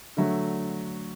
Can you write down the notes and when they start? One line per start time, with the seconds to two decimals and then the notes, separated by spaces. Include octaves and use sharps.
0.17 D3 F#3 A3 E5